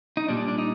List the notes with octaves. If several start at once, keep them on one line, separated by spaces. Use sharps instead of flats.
D#4
A#2 G3 D4
D4
D#4